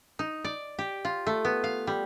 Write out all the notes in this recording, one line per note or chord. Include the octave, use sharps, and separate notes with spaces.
D#4
D5
G4
F4
A3
B3
F5
G3